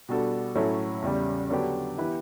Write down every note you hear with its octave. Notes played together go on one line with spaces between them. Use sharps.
B2 G3 D4 F#4 A4
A2 F#3 C#4 E4 A4
E2 C#3 G3
D3 F#3 B3 D4 G4
E3 B3 E4 G4 B4